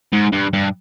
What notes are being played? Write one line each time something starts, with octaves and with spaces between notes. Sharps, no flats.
G#2
G2
G2